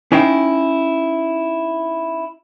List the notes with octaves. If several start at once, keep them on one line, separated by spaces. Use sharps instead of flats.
C#4 D#4 E4 F5 G5